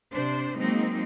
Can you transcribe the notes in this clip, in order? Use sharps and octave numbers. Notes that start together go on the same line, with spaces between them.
C3 D4 C5
F#3 G#3 A#3 C4 D#4